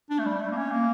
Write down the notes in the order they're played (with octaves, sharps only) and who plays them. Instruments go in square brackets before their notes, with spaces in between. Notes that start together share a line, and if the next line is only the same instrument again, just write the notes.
[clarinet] D4
A3
G3
A3
A#3
C#4
A#3